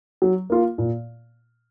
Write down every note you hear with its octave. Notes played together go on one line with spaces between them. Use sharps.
F#3
A#3 F4
A#2